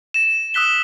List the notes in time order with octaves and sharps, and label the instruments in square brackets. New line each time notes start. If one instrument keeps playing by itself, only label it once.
[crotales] A#6 E7
D#6 E6 F#6 B6 G7